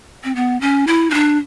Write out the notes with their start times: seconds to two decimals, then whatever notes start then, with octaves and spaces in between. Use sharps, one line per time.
0.24 C4
0.36 B3
0.61 C#4
0.87 E4
1.10 D#4
1.14 D4